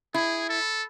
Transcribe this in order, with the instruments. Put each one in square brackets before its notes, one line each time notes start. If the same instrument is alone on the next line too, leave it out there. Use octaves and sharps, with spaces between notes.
[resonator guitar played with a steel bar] E4 [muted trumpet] G#4
[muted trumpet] A4